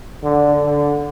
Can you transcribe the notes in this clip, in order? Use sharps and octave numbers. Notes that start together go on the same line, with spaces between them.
D3
D3